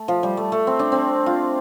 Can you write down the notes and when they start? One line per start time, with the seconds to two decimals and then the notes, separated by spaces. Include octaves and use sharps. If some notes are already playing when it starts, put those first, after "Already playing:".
Already playing: A3
0.08 F3
0.23 G3
0.37 A3
0.52 A3
0.67 C4
0.79 D4
0.92 C4
1.26 F4